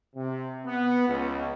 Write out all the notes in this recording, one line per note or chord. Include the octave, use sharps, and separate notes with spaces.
C3
B3
C#2